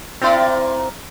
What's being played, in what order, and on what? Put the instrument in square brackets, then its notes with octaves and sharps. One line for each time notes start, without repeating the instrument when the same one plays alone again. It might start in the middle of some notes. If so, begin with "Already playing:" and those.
[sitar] A#2 E4 D5 [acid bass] C4